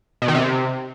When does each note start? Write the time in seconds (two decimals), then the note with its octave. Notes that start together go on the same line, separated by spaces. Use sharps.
0.22 B2
0.28 D#3
0.35 C3